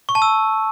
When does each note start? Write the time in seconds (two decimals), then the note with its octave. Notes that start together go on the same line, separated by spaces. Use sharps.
0.09 C#6
0.15 A5
0.22 E6